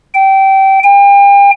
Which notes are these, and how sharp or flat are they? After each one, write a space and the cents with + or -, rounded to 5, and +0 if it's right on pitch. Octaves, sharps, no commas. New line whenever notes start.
G5 -20
G5 +40